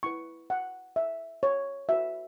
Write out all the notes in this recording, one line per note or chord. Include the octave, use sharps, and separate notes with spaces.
E4 B4 C#6
F#5
E5
C#5
F#4 B4 E5